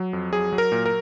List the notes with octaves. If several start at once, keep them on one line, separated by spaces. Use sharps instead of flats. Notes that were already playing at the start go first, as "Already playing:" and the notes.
Already playing: F#3
F2
F#3 G#4
F#3
A#4
A#2
A#4